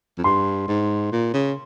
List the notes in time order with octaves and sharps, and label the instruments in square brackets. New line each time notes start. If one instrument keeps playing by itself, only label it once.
[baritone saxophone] F2
[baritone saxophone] G2 [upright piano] C6
[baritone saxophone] G#2
A#2
C#3